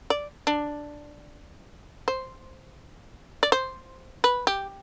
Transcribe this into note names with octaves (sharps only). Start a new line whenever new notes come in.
D5
D4
C5
D5
C5
B4
G4